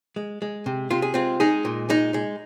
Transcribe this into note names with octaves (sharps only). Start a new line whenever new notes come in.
G#3
G#3
C3
C3 F4
G#4
G#3 C4 F4
G#3 D#4 G#4
A#2
G#3 D#4
G#3